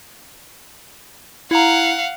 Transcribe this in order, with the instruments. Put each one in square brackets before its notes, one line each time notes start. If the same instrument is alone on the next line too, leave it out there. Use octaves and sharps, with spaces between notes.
[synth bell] E4 A#5 [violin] F5 F#5